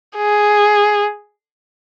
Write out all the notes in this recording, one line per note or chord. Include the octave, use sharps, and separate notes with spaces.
G#4